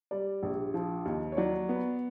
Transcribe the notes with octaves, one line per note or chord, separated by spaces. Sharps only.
G3 D5
A#1
F3
D#2
C#5
F#3 D5
B3